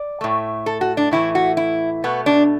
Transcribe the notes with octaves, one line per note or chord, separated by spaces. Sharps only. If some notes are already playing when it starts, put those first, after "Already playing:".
Already playing: D5
A2 A3
A4
F#4
D4
A2 E3 A3 E4
F#4
E4
B2 A3 B3
D4